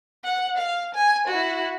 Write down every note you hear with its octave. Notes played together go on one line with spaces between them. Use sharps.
F#5
F5
G#5
E4 F#4